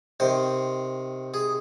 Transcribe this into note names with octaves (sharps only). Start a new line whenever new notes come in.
C3 D#3 C5
G#4